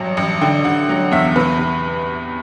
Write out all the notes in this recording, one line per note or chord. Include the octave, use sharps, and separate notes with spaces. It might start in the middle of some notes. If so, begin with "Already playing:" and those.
Already playing: A1 G2 F#3 A5
A1
D3 G5
D3 F#5
F#3
E2 E5
C3 B4
C3